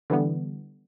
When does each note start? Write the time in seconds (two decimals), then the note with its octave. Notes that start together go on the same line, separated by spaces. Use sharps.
0.10 D3 E3 G3 B3